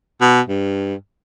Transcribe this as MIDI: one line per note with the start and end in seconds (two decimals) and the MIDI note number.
0.21 0.41 47
0.48 0.94 43